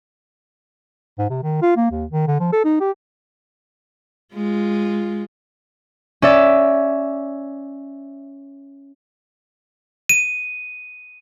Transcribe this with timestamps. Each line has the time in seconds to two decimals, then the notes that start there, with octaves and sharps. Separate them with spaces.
1.18 G#2
1.30 C3
1.43 D#3
1.62 F4
1.77 A#3
1.91 D#2
2.11 D#3
2.28 D3
2.40 F3
2.53 A4
2.65 D#4
2.81 G4
4.35 G#3 F4
6.22 C#4 D5 E5 A6
10.09 D#7